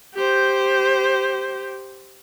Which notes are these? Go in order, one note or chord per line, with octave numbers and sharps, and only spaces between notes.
G4 C5